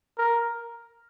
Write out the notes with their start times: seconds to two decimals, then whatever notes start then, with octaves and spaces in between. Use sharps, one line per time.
0.18 A#4